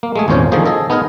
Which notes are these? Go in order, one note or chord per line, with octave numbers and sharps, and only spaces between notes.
A#3
G#3 A3 G#4
G#1 E2 A#2 C#4 C5 C#5
D3 D#3 F3 A#3 G#4 C5
G#4 A4 D#5
B3 D#4 G#4 A#4